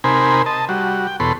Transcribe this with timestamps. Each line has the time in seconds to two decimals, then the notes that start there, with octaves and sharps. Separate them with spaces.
0.04 C3 D#4 A#4 C5 G#5 B5
0.46 D#5 A5
0.69 G3 F#4
1.07 G5
1.20 E2 B2 A4 C#5 B5 C6